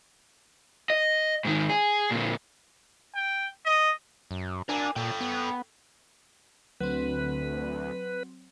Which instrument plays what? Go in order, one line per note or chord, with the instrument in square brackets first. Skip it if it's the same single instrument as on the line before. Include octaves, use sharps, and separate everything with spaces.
[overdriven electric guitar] D#5
G#2 D#3
G#4
A#2 D3
[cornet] G5
D#5
[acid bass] F#2
[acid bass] D4 [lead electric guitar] A#4 G#5
[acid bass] A#2 [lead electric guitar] A4 G5
[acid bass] B3
[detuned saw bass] D2 [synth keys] F#3 C4 [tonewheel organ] B4